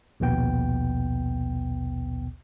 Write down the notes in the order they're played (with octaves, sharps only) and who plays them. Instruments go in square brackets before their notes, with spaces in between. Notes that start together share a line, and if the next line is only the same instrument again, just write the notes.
[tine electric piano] A#1 D#2 B2 B3 G5